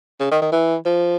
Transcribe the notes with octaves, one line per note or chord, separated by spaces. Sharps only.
C#3
D#3
D#3
E3
F3